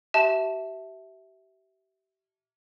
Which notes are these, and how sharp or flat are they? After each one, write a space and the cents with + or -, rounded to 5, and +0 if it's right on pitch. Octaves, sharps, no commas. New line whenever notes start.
G4 -40 E5 -10 A5 +0